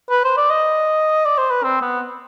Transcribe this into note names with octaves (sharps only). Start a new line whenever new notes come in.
B4
C5
D5
D#5
D5
C5
B4
C4
B3